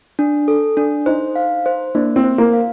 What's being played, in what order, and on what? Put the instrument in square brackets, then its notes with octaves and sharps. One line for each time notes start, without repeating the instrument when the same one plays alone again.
[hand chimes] D4
A4
D4
[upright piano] D#4 [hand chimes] C5
[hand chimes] F5
C5
[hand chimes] A#3 [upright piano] D4
[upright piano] C4
[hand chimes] C5
[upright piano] A#3
[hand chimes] F5